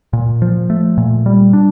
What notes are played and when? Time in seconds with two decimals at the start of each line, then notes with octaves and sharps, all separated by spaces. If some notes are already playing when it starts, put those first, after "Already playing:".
0.13 A#2
0.42 F3
0.70 A3
0.97 A#2
1.26 G3
1.53 D4